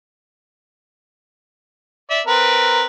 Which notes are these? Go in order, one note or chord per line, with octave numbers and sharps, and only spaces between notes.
D5 E5
C4 A#4 B4